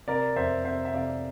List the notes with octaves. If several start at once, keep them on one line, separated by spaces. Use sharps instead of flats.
C3 A#4 D5
F2 C5 E5
C3 C5 E5
E5
C3 D5 F5